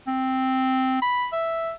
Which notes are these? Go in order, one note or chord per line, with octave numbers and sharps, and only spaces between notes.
C4
B5
E5